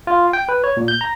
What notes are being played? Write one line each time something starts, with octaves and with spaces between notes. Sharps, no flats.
F4
G5
B4
C#5
A#2
G6
A#5